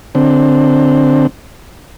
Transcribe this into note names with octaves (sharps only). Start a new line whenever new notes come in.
D3 C4